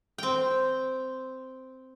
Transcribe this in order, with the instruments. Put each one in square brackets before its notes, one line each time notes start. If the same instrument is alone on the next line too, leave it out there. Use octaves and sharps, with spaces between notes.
[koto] C4 G5